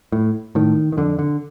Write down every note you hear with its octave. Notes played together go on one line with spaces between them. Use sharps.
A2
A2 D#3
D#3
F2 D3
D3